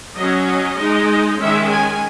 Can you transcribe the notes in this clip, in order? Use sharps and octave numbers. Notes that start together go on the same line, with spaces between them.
F#3 C#4 D#5
D#5
G#3 D#4
D#3 G#3 C#4 E5
G#5